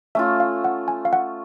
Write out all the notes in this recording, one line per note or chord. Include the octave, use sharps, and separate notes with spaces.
A3 C#4 F4 E5
F5
F#5
G#5
F5
F#5